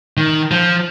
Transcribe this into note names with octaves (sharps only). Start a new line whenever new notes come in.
D#3
F3